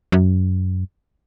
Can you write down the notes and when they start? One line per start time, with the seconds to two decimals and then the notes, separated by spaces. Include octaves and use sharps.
0.12 F#2